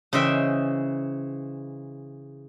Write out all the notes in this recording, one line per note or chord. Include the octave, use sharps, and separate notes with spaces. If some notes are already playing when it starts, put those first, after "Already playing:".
C#3 E3 C5 D#5 E5 G5